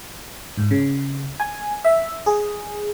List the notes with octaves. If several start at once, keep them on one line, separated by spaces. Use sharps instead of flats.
G#2
C#3
G#5
E5
G#4